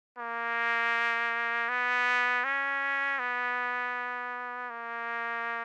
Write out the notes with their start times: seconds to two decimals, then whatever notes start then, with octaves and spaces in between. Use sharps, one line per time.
0.18 A#3
1.69 B3
2.44 C#4
3.19 B3
4.70 A#3